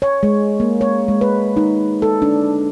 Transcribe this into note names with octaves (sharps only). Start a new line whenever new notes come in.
C#5
G#3
A#3
C#5
G#3
B4
D#4
A4
D4